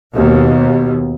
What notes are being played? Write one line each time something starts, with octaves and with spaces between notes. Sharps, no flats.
D#2 B2